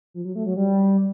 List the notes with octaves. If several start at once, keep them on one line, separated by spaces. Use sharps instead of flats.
F3
F#3
A3
F#3
G3